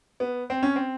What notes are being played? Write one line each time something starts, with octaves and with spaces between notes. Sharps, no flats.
B3
C4
C#4
C4